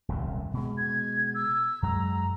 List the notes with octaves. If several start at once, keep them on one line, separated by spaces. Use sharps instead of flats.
D#1 C2 F#2
B2 G#3
G#6
E6
F#2 F#3 G#3 A#5